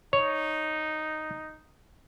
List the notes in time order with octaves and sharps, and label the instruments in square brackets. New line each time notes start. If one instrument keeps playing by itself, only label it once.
[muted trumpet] D#4 [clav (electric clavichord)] C#5